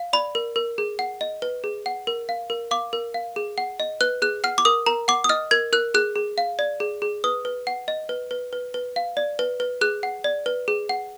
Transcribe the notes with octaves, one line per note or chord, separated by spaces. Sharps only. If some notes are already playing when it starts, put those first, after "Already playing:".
Already playing: F5
D5 B5
A#4
A#4
G#4
F#5
D#5
B4
G#4
F#5
A#4
F5
A#4
F5 D6
A#4
F5
G#4
F#5
D#5
B4 F#6
G#4 F#6
F#5 F6
D6
A#4 D#6
A#4 A#5
F#5 D6
D#6
D#5 F6
A#4 G#6
A#4 F#6
G#4 F#6
G#4
F5
D5
G#4
G#4
B4 D#6
B4
F#5
D#5
B4
B4
B4
B4
F5
D5
B4
B4
G#4 F#6
F#5
D5
B4
G#4
F#5